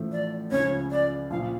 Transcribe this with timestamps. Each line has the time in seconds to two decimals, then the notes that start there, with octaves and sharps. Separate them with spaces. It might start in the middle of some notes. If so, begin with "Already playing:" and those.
Already playing: A1 A2 F3 A3
0.12 D5
0.51 C#2 C#3 F3 C#5
0.91 D5
1.31 A#1 A#2 F3 F5